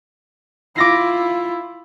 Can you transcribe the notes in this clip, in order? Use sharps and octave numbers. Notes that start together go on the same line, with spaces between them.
E4 F4 D6 A#6 C7